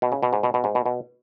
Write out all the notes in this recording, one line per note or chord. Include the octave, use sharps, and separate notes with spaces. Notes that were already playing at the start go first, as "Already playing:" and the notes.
B2
C#3
B2
G#2
B2
B2
G#2
B2
B2